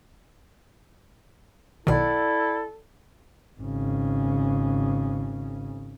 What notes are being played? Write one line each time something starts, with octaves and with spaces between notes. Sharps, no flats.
B1 B2 D#3 E4 A4 D5 F#5
G#1 C#3